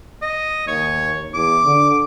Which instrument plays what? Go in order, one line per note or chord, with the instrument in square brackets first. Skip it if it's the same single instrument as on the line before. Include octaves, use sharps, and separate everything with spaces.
[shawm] D#5
[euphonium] D#2 [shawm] C#5
[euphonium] E2 [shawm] D6
[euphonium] D3